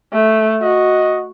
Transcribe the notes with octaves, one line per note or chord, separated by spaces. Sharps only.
A3
F#4 D#5